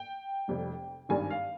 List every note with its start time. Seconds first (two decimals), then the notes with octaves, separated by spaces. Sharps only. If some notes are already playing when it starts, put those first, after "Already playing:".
Already playing: G5
0.48 F1 F2 C3 G3
1.09 G#1 G2 D#3 G3 G#5
1.30 F5